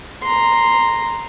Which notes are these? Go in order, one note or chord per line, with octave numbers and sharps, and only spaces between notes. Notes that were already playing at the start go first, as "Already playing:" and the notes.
A#5 C6